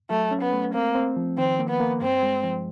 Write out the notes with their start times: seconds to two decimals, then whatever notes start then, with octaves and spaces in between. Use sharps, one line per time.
0.10 F#3 A3
0.31 C#4
0.42 B3
0.52 A3
0.74 A#3 C4
0.95 C4
1.16 F3
1.38 D#3 C4
1.59 A#3
1.69 B3
1.80 A#3
2.01 G2 C4
2.23 G#3
2.44 F3